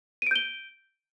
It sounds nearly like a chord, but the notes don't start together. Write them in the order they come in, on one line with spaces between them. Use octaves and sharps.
D#7 D7 G6 G7